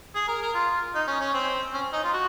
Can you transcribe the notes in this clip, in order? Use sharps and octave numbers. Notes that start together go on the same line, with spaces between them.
G#4
A#4
A#4
F4
D#4
C#4
C#4
C4
C#4
D#4
F4
F#4